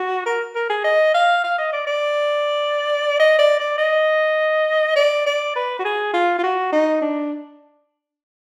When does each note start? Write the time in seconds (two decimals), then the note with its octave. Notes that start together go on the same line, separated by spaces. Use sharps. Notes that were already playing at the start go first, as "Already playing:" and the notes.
Already playing: F#4
0.26 A#4
0.55 A#4
0.69 G#4
0.84 D#5
1.14 F5
1.44 F5
1.58 D#5
1.73 D5
1.87 D5
3.19 D#5
3.39 D5
3.59 D5
3.78 D#5
4.96 D5
5.26 D5
5.55 B4
5.79 F#4
5.84 G#4
6.14 F4
6.39 F4
6.43 F#4
6.73 D#4
7.02 D4